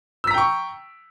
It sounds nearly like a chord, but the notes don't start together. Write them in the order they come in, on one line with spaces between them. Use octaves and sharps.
E6 B6 A#5 G5 C#6